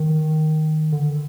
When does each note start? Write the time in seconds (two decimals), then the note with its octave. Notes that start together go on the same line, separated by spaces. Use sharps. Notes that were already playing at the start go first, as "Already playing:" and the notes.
Already playing: D#3
0.93 D3